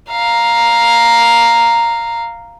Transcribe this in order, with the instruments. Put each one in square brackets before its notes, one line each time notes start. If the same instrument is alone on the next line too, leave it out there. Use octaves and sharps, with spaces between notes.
[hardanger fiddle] F5 A#5